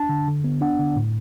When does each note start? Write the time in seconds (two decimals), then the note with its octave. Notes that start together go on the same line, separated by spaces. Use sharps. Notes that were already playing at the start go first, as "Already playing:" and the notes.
Already playing: D4 A5
0.09 D3
0.28 D3
0.44 B3
0.61 D4 F#5
0.79 D3
0.96 A2